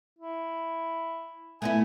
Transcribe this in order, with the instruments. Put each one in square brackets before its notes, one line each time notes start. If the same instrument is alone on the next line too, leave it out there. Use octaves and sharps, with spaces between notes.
[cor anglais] E4
[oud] A3 B3 E4 [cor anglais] G#5